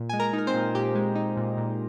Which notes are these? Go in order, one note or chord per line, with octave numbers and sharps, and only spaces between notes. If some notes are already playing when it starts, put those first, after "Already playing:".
Already playing: A#2
G#3 G#5
A#4 A#5
D#4
A#4
C4 C5
A#2
A#2 G4
G#3
D#4
A#2
A#2